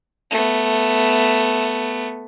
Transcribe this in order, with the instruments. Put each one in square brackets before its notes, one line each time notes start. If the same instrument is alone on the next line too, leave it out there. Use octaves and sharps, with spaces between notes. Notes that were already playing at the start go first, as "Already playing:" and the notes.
[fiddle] A3 B3